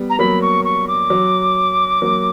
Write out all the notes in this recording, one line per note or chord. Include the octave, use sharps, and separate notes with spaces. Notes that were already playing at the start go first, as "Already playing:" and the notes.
Already playing: G3 B3
A#5
F#3 A#3 B5
C#6
C#6
D6
F#3
F#3 A#3